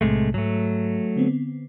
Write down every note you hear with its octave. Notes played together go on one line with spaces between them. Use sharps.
B1 A2 C3 G#3 A3
G#2 F#3 A3
D3 B3 C4